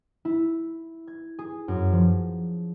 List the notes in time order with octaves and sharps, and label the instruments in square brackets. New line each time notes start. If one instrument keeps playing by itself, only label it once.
[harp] E4
G#6
G#4
F#2
F3